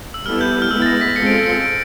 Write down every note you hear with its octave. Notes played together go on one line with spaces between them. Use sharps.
E6
G3 B3 E4 A4 F6
G6
F6
G#3 B3 E4 E6
A6
A#6
B6
G#3 C4 F4 A4 C#7
D7
C#7
C#7
D7